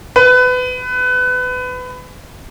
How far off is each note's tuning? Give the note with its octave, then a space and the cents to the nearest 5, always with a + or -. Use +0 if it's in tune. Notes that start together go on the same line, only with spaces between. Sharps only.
B4 +25